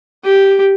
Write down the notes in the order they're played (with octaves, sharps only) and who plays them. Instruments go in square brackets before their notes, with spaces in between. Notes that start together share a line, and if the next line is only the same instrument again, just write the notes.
[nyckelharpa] G4